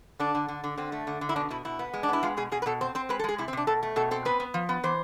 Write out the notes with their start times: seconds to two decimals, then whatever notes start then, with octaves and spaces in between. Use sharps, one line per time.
0.19 D3 D4
0.35 D3
0.48 D3
0.64 D3
0.78 D3 C4
0.92 A3
1.07 D3
1.21 D3
1.29 E4
1.36 B2 D4
1.50 B2 E4
1.65 B2 E4
1.79 B3
1.93 G#3
2.03 D4
2.09 B3 E4
2.23 G#3 F4
2.37 B2 G#4
2.52 B2 G#4
2.62 B4
2.66 B2 A4
2.81 C4 C5
2.95 C4 C5
3.09 G#3 B4
3.19 A4
3.24 G#3 G#4
3.38 C3 E4
3.48 C4
3.53 C3 D4
3.67 B2 A4
3.83 A3
3.96 B2 A4
4.11 C4 A4
4.25 B3 B4
4.40 B3
4.54 F3
4.69 B3
4.83 E3 C5